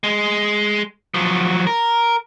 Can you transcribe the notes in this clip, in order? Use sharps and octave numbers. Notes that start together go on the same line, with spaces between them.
G#3
F3 F#3
A#4